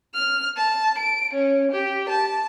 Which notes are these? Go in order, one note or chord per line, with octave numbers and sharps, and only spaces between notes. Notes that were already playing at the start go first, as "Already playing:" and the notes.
F6
A5
D7
C#4
G4
A5